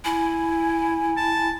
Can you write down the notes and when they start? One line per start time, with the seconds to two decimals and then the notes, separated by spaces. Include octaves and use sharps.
0.05 E4 G#5
1.17 A5